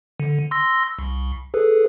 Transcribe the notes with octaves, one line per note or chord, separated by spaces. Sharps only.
D3
C6 E6 A#6
C2
G#4 A4 B4